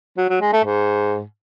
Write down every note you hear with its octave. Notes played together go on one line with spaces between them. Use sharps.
F#3
F#3
G#3
A3
G#2